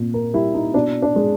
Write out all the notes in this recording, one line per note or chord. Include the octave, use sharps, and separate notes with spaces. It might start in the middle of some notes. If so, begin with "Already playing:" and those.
Already playing: A#2
A#4
G3 E4
D#4
B2 D4
D4
G#3